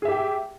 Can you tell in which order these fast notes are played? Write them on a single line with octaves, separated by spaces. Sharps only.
G#4 E5 G4 G5